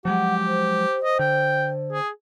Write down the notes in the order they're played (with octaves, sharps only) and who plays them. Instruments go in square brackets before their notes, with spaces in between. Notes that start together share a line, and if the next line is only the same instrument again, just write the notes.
[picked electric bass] F3 F#3 G#3 [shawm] G4 [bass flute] F#5
[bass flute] C5
[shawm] D#5
[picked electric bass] D3 [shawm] G5
[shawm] G#4